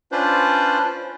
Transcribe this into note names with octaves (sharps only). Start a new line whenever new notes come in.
C#4 D4 F4 B4 C5 D5